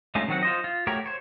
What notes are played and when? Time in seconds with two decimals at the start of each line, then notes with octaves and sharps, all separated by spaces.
0.15 G#3 A3 C#4 D#4 F4
0.28 D#3 F#3 C4 F#4 F#5
0.43 F4 C5 D#5
0.64 F4
0.87 A3 F#4 G4 A#4 C#5
1.06 C5 C#5